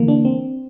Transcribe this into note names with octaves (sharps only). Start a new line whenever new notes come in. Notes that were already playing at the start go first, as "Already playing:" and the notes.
Already playing: D3 E3 A#3
D4
C4